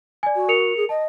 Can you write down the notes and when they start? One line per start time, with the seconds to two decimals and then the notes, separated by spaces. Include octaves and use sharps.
0.23 D5 G#5
0.35 F#4
0.49 A#4 C#7 F7
0.76 G#4
0.89 D#5 A5